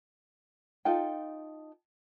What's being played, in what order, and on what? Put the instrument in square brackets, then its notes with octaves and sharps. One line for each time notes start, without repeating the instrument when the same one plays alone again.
[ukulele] D#4 F4 A4 G5